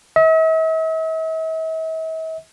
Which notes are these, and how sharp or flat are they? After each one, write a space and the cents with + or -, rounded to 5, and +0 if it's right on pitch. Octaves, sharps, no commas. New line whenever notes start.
E5 -45